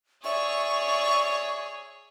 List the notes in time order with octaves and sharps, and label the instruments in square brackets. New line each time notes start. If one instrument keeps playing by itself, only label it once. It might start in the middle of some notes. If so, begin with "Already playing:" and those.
[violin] G#4 C#5 [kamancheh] D5 E5 [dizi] C#6